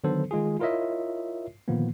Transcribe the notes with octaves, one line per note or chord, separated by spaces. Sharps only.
D3 D#3 F#3 B3 A4 C5
D#3 G#3 F4 G#4
E4 F4 A#4 C#5 D#5 E5
A#2 D3 D#3 F3 A#3 B3